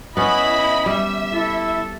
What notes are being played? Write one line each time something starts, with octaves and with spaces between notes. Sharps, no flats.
B3 C#4 E4 D#5 B5
G3 E5
E4 A4